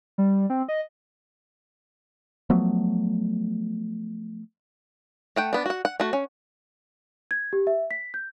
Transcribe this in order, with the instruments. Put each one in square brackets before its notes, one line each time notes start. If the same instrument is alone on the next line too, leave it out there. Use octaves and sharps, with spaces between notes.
[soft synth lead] G3
C4
D#5
[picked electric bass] F3 F#3 A3 B3
[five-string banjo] A3 F#5 G5
B3 D4
F#4 F#5
F#5
A3 F#4
C#4
[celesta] G#6
G4
E5
B6
G6